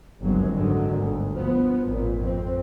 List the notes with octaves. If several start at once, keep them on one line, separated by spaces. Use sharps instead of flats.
G1 C#2 F#2 F#3 G#3 C4
G#2 D3 D#3 F#3
G1 D2
F3 B3
G#1 A#2
F2 C4